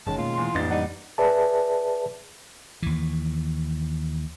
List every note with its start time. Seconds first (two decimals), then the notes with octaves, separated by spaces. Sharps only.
0.07 F#1 D#3 G#3 C#4 A5
0.18 B2 A3 A#3 F4
0.34 E2 C6
0.55 A1 F2 A#3 D4 D#4 G4 A6
0.71 G3 D#4 D5 F#5
1.18 G#4 B4 D5 E5 A5
2.83 D#2 E3